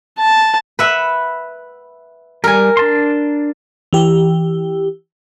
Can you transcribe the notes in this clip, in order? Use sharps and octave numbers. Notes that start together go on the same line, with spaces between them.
A5
B4 E5 F#5
G3 A#4 G#5
D4 A5 C6
E3 G4